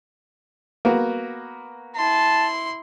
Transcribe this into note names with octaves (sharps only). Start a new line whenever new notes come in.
A#3 B3 F#4
E4 A5 C6